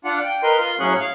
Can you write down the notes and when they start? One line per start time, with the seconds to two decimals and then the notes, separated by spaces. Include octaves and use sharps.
0.05 D4 F4 F#5
0.23 G5
0.43 A#4 B4 D#5 C6
0.59 F4 C6
0.79 A2 F#3 C#4 G#4 C#6 F#6
1.00 F5